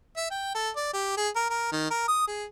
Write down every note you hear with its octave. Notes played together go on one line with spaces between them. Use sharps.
E5
G5
A4
D5
G4
G#4
A#4
A#4
D#3
A#4
D#6
G#4